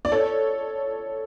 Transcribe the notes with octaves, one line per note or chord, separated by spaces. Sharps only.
D5
A4 C#5